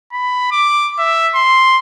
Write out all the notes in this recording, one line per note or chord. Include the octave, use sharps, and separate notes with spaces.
B5
D6
E5
C6